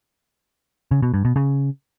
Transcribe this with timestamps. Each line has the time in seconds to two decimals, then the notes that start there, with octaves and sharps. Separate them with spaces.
0.91 C#3
1.02 B2
1.14 G2
1.25 B2
1.36 C#3